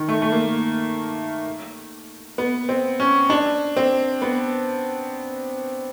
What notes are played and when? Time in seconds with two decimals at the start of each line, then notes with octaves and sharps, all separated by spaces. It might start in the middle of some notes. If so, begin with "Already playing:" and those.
Already playing: D#3
0.08 A3
0.22 A3
0.32 A#3
2.38 B3
2.69 C4
3.00 C#4
3.30 D4
3.77 C4
4.22 B3